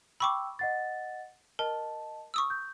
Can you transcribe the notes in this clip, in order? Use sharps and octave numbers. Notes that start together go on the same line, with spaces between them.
G5 B5 C#6 D6 E6
D#5 F#5 A6
A#4 D#5 A5
C#6 D#6 E6
G6